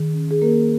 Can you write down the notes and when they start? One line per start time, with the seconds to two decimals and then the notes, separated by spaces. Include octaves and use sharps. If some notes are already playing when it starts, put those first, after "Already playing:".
Already playing: D#3 G#4
0.14 C#4
0.31 G#4
0.42 A#3 A#4